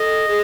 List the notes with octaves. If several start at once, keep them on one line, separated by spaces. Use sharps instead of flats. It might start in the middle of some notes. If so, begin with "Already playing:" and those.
Already playing: A4 D#5
G#4